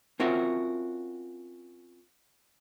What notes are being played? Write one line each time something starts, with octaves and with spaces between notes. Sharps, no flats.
C4 C#4 F4 F#4 A#4 E5